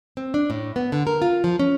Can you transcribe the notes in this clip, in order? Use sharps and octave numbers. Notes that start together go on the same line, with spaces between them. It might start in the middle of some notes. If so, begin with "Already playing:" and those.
C4
D4
A2
B3
D3
A#4
F4
F3
C#4